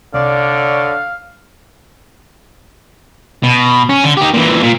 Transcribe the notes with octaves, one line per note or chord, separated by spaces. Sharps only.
C2 D3 C#5 D5 F5
B2
C#4
D3
D#4 G4
A#2 E3
A#2